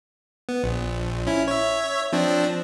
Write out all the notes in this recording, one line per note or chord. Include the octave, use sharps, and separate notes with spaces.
B3
A#1
C#4 E4
C#5 E5
F3 C4 D4